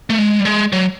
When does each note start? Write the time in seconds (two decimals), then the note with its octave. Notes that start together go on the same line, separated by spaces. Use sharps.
0.10 A3
0.18 G#3
0.39 G3
0.45 G#3
0.73 F#3